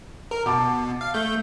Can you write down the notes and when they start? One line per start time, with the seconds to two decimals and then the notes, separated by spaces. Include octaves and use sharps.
0.31 A#4
0.46 B2 A5 D6
1.01 F5
1.14 A3 G6